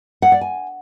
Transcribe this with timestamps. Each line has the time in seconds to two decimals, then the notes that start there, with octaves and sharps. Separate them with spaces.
0.22 F#5
0.32 D5
0.41 G#5